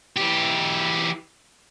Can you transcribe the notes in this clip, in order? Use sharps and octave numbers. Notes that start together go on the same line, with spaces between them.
E3 G4